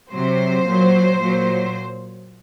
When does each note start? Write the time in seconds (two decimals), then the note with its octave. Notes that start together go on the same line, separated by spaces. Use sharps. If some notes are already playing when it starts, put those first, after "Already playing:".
0.12 C3 F#3 C5
0.65 A#2 F#3
1.19 A#2 F#3